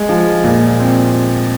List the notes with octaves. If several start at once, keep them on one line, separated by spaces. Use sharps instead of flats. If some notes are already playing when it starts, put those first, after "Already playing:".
Already playing: G#3
F3
A#2
C4